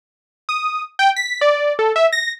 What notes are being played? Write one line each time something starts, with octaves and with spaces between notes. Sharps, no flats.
D#6
G5
B6
D5
A4
E5
A#6